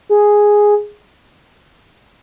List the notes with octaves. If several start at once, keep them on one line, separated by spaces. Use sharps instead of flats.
G#4